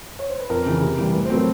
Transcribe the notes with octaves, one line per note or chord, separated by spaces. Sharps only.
C#5
C5
B4
F2 A#4
C#3 E3
C3
E3 G3
A2 B4
C5
F#3 A3 C4 A#4